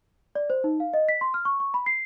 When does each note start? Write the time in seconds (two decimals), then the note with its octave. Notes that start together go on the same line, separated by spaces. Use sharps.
0.35 D5
0.50 C5
0.64 D#4
0.80 F5
0.94 D#5
1.09 B6
1.21 C6
1.34 F6
1.45 C#6
1.60 C#6
1.74 B5
1.86 C7